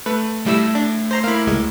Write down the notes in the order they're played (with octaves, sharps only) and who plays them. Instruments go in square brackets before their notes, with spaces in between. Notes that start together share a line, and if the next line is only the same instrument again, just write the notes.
[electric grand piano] A3 [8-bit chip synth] B4
[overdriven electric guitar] A2 [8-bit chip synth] G3 E4 E6
[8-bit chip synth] D4
C5 A#5 C6
[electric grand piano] A#3 E4 [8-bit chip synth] F5 B5
[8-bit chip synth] C#2 G#3